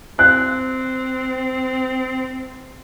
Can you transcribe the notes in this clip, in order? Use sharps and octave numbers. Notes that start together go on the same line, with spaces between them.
C4 F#6